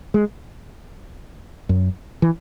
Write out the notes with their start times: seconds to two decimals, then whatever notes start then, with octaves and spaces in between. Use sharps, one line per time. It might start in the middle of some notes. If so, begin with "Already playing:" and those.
0.14 G#3
1.69 F#2
2.22 E3